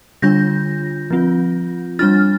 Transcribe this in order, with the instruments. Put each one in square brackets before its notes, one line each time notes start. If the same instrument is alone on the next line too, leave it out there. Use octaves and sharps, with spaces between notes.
[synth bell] D3 G3 D4 F4 G6 A#6
F3 C4 F4
G3 D4 F4 F6 A6